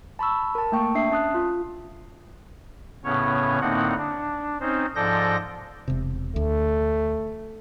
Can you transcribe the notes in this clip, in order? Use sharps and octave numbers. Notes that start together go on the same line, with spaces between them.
A5 B5 C#6 E6
A#4 A5
A3 A#3 G5 C#6
D4 E5 C7
C#4 A5 D#6 F#6
F4
A2 C#3 B3 C#4 C#5
A2 D3 A#3 C4 D#4 F#5
D4
C4 C#4 D#4 C5
G#2 F3 A4 D5 G6 A#6
E1 C3
D2 A3